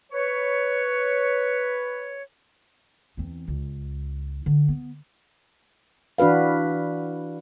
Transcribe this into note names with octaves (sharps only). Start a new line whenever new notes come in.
B4 C#5
E2 C4
C#2
D3
B3
E3 D4 F#4 B4 F5